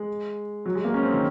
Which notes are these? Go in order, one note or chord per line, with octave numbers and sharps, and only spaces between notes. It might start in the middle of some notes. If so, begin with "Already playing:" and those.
Already playing: G#3
F#3
G#3
A#3
C#4
C4
D#3